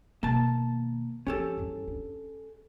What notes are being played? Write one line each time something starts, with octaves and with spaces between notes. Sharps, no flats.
B2 D#3 A#3 A5
F3 C#4 G4 A4
E2 G2
D4